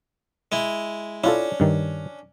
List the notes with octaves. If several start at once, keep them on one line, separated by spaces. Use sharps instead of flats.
G#3 E4
C#4 D4 E4 F4 A4
G2 D#3